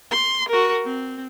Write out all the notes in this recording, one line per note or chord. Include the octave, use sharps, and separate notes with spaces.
C6
F#4 A#4
C4